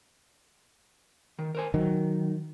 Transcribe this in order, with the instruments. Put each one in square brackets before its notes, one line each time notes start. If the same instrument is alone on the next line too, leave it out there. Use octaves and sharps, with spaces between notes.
[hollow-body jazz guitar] D#3
A#4 C5 G#5
[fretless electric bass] D#3 [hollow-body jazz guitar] F#3